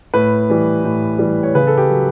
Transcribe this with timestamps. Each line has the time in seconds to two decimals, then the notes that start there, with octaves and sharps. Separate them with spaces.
0.14 A2 B4
0.50 E3 G3
0.84 A2
1.19 E3 G3
1.43 C#5
1.54 C#3 B4
1.67 A4
1.77 G4
1.90 F#3